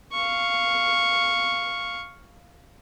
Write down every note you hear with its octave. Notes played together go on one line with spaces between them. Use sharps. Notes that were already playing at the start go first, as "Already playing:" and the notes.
F5 C#6